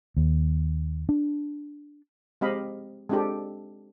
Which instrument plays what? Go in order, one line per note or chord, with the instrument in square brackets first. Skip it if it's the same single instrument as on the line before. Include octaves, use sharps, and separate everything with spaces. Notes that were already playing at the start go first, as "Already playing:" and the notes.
[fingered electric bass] D#2
D4
[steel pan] G#3 C4 G4 D#5 F5 B5
G#3 C4 D4 F4 G4 A4